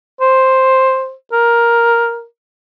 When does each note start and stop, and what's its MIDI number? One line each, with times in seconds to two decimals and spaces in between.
0.21 1.13 72
1.33 2.24 70